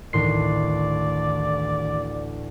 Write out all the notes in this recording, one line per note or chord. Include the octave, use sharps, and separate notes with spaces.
A1 D2 A2 D#3 D5 C6 C7